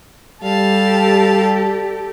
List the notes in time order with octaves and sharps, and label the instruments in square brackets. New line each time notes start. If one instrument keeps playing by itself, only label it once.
[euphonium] G3 [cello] G4 A4 [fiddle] F5 A5